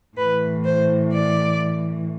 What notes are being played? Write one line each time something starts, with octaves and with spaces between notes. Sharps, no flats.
A2 E3 B4
C5
D5